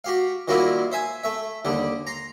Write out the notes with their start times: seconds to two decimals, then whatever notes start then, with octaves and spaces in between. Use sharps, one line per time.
0.04 F#4 G4 F5
0.48 D#3 F#3 G3 A#3 E4 F4
0.92 C5 E5 G#5
1.23 A3 E5
1.65 D#2 D3 G3
2.07 A#5 C6